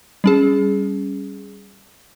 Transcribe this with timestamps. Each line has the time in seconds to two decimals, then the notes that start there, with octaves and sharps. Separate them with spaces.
0.24 G3 C#4 G#4